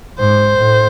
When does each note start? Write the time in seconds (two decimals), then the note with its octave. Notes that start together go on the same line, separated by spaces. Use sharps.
0.19 G#2 C5
0.59 A2